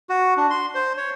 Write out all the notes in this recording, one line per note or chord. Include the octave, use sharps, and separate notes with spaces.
F#4
D4
C6
C5
C#5